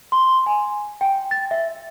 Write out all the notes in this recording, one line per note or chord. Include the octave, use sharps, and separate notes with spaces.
C6
G#5
G5
A6
E5